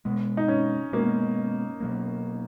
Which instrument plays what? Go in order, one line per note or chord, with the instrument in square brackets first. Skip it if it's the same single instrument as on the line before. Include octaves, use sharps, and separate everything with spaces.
[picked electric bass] B2 G#3 B3
[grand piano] D#4
C#4
[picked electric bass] B2 G#3 B3 [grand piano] A#3
[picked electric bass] B2 F#3 A#3